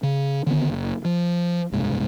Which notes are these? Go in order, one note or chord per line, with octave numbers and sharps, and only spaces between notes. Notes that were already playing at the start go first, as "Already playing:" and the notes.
C#3
D3 D#3 B3
F#1
F3
F#1 C2 G#2